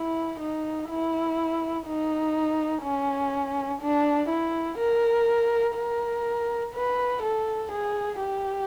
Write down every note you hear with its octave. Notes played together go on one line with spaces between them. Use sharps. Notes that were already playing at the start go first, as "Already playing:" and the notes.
Already playing: E4
D#4
E4
D#4
C#4
D4
E4
A#4
A#4
B4
A4
G#4
G4